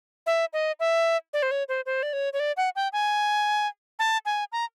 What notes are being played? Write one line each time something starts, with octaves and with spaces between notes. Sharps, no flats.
E5
D#5
E5
D5
C5
C#5
C5
C5
D5
C#5
C#5
D5
F#5
G5
G#5
A5
G#5
A#5